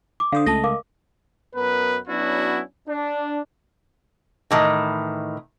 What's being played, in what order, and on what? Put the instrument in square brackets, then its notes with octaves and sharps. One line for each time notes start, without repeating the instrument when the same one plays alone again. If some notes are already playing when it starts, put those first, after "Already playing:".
[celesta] D6
[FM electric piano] D3 C5 [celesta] F5 D#6
[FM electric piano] C#2 A3 D#5 [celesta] A5 A#6
[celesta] A#4 F5 D6
[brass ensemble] F#2 B3 A#4 B4
F#3 B3 C#4 D4 E4 F#4
D4
[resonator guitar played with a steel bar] A2 D#3 E3